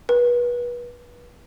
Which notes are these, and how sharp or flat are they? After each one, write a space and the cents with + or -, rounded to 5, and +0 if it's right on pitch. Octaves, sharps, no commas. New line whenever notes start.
B4 -30